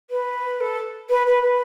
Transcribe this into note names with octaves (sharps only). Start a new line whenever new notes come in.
B4
A4
B4
B4
B4